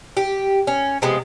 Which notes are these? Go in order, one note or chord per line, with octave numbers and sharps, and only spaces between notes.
G4
C#4
C3 F3 G#3 B3